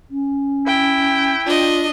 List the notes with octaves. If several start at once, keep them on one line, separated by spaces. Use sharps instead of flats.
C#4
E4 G5
D4 F4 D#5